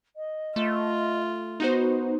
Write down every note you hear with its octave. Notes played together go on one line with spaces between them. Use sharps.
D#5
A3 F4
B3 D#4 F#4 C5